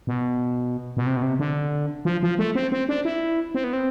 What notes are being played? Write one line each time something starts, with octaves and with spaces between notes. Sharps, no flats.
B2
B2
C3
B2
C3
D3
F3
F3
A3
C4
C4
D4
E4
C4
B3
C4